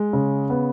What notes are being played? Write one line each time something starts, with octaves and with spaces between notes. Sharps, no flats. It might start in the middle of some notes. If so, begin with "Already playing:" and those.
Already playing: G#3
C#3
B3